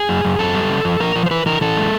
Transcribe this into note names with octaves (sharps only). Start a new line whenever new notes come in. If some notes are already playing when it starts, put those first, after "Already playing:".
Already playing: G#4
F#2
F#2
F#2 A4
G3
C#3
F3
F3 A#4
F3
C5
E3 B4
E3 A#4
E3 A4
G#3